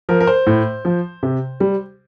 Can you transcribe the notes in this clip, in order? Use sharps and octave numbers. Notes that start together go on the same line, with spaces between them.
F3 A#4
A#4
C5
A2
F3
C3
G3